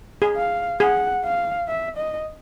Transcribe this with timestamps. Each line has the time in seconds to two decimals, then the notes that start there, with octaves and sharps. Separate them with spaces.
0.22 G#4
0.36 F5
0.80 G#4 F#5
1.24 F5
1.68 E5
1.97 D#5